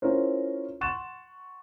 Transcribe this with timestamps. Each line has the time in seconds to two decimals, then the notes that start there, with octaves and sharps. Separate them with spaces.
0.02 C#4 E4 F4 A#4 C5
0.81 F#5 C6 C#6 F#6 A6 E7